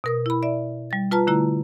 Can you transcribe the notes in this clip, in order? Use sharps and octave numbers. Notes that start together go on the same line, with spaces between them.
B2 A#4 D#6
E4 B5
D5 E5
G3 A6
F4 B4 A5 A#5 F6
D3 A3 E4 A#5